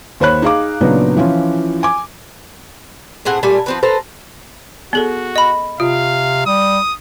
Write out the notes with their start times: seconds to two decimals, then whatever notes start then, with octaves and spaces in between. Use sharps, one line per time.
0.20 D#2 C5 C#5 B5 F#6
0.42 D#4 G#4 F5 D6
0.81 A#2 C#3 F#3 B3 D4 D#4
1.17 E3 F3 C#4 F4
1.83 G#5 D6
3.25 A2 C4 G#4 F#5
3.43 A#2 G3 A3 G#5
3.66 F3 C4 B4
3.83 A4 B4 C5 A#5
4.93 B3 F#4 G#4 A4
5.36 D#5 B5
5.80 C3 F4 F5
6.46 G3 D#6